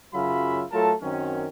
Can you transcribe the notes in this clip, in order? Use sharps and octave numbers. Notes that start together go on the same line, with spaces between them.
F#2 C#3 F#3 F4 E5 B5
F#3 A3 F4 A4 A#4 A5
F#2 D#3 F#3 C4 C#4